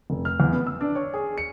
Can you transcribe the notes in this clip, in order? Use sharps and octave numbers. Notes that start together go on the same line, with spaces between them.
F1
F6
E2
B3
E6
D4
C#5
G#4
C#7